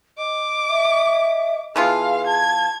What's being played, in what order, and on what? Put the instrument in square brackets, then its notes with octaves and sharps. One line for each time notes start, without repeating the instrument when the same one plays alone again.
[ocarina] D#5 [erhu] D6
[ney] E5
[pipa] E3 B3 F4 [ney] G#4 [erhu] F5 [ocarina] A5
[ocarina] A5 [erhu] G#6